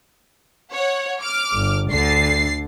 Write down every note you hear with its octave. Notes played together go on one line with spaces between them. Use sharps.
C#5 F#5
D6 F6
G1
D2 D3 A6 C7